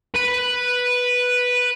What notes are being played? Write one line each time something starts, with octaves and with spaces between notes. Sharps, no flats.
B4 B5